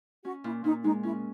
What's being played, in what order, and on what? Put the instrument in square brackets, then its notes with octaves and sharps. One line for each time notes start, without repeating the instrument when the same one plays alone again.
[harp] C#4 [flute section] F#4
[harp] A#2 [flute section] E4
[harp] A#2 [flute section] D#4
[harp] G#3 [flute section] D#4
[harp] C#4 [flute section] E4